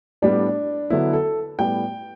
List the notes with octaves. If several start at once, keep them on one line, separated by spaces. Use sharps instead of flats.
A2 G3 B3 D4
D3 F#3 B3 E4
A4
A2 G3 B3 G5